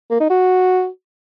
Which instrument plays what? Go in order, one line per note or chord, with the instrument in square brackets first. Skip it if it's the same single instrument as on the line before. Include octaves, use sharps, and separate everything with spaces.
[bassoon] A#3
D#4
F#4